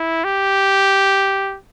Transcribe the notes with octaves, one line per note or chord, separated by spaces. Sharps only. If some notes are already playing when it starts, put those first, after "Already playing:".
Already playing: E4
G4